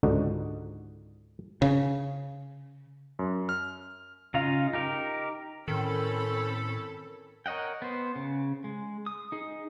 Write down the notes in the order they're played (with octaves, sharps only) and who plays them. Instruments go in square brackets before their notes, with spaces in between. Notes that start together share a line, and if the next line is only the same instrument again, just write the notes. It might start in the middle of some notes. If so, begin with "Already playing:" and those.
[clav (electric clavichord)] C#2 G#2 D3 D4 D#4 F#4
[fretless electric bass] C#3
[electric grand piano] F#2
F6
[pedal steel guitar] C#3 D#4 F4 F5 A#5
D#4 G4 A#4
[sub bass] A2 [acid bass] D#3 [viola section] C4 C#4 B5 [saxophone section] A4
[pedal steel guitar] A#4 C#5 D#5 F#5 G5
B3 C5
C#3
G#3
D#6
D#4 G#4